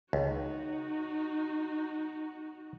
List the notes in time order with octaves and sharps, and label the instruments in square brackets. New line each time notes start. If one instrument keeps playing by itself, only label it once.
[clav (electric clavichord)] C#2 [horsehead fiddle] D#4 F#4